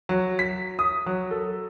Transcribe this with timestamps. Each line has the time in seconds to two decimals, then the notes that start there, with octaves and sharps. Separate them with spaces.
0.09 F#3
0.39 B6
0.79 D#6
1.06 F#3
1.31 A4